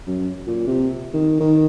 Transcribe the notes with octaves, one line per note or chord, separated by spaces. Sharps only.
F#2
A#2
C3
D#3
D#3